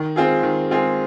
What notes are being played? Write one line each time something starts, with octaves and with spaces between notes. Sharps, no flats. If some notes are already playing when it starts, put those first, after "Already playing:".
Already playing: D#3
G#3 C4 F4 G#4
D#3
G#3 C4 F4 G#4